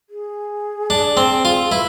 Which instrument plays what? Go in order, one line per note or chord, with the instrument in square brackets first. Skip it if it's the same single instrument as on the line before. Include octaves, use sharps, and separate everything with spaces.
[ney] G#4
[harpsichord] D4
C4
F4
[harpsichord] E4 [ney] B4